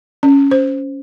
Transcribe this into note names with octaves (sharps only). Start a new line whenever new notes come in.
C#4
C5